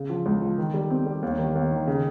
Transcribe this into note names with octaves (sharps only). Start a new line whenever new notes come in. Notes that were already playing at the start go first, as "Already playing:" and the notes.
Already playing: C#3
F3
C#2
F3
D#3
G3
C4
G3
D#2
D#3
D#2
D#3
C#3